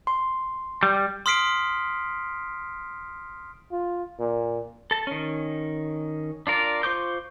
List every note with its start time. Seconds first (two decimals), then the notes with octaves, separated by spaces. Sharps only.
0.07 C6
0.83 G3
1.26 C6 D#6 F6 B6 C7 D7
3.72 F4
4.20 A#2
4.91 A4 A5
5.07 D#3 C#4
6.47 D4 F4 A#4 D5
6.83 F4 C5 C#6 D6 G6